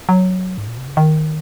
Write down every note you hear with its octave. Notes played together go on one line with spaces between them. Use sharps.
F#3
G#2
A#2
C3
C#3
D#3